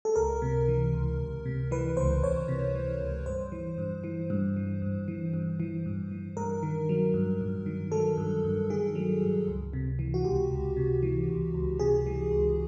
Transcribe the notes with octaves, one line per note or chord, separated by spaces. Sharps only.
A4
C#2 A#4
C3
E3
C#2
C#2
C3
E3 B4
C#2 C5
C#2 C#5
C3
E3
C#2
G2 C5
E3
G2
E3
G2
E3
G2
E3
G2
E3
G2
E3
G2 A#4
D#3
F#3
G2
G2
D#3
F#3 A4
G2
G2
D#3 G#4
F#3
G2
C#2
C3
E3
F#4
C#2 G4
C#2
C3
E3
C#2
C#2
C3 G#4
E3
C#2